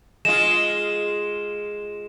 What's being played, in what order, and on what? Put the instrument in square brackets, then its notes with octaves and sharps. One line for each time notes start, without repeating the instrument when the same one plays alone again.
[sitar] G#3 F4 [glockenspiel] E7